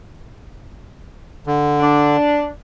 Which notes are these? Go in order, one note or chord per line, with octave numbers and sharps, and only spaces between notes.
D3
D4